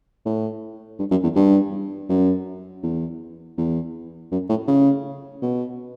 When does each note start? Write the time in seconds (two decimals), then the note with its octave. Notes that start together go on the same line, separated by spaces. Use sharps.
0.26 A2
0.99 G2
1.11 F#2
1.23 E2
1.36 G2
2.10 F#2
2.83 E2
3.58 E2
4.32 F#2
4.50 A2
4.68 C#3
5.42 B2